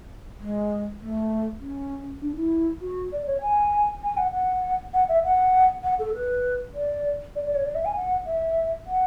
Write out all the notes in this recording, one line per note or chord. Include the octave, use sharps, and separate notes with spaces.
G#3
A3
C#4
D4
E4
F#4
D5
C#5
G#5
G#5
F#5
F#5
F#5
E5
F#5
F#5
A4
B4
D5
D5
D5
C#5
D5
E5
G#5
F#5
E5
F#5